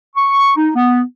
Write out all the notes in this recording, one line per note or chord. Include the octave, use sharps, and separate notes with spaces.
C#6
D#4
B3